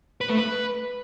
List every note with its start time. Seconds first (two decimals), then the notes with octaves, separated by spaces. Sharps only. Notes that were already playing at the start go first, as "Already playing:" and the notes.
0.21 B4
0.29 A3
0.37 B4